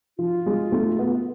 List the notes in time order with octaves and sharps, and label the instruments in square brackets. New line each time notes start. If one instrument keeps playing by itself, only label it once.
[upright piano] F3 [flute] F4
[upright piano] G#3
A3
B3